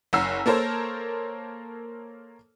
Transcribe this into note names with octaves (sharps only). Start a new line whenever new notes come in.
F#1 F#5 A#5 E6 C7
A#3 A4 A#4 C5 C#5